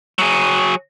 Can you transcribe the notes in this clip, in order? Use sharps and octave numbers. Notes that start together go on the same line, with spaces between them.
F#3 G#4